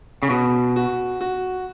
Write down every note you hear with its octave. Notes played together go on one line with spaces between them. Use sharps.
C#3
B2 F#4
F#4
F#4